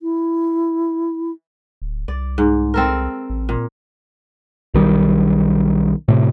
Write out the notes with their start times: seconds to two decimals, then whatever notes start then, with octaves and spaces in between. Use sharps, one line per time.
0.02 E4
1.82 D1
2.08 C2 D5
2.38 G#2
2.74 C4 A4 A#4
3.30 A1
3.49 A#2
4.74 B1 D#3 G3
6.08 A2 C3